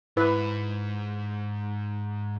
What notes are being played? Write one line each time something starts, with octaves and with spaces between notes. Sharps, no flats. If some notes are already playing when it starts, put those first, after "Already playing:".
G#2 E4 B4